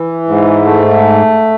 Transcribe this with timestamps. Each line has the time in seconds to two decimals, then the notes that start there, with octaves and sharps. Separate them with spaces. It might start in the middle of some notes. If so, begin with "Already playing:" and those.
Already playing: E3
0.28 G#2
0.66 A3